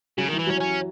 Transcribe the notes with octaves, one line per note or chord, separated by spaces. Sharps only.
C#3 F#3
D#3 E3
E3
F#3 C#4
C#4